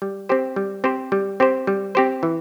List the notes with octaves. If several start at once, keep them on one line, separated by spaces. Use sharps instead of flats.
G3
C4 G4 C5
G3
C4 G4 C5
G3
C4 G4 C5
G3
C4 G4 C5
E3